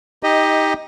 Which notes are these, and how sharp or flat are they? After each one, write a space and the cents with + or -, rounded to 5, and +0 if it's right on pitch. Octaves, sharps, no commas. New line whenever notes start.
D#4 +15 G4 +15 D#5 +0